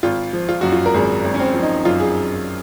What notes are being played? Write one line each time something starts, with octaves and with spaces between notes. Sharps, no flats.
G#1 F4
F3
F4
F#2 F#4
F4
A#4
G#1 G#4
G#1
C#4
C4
F3
D#4
F#2 F4
G#4